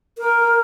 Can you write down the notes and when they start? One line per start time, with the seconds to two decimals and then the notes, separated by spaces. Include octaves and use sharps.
0.18 A#4